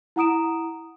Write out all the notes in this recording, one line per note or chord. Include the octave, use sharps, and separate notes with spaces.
E4 F#5 A#5 D#6 D7 E7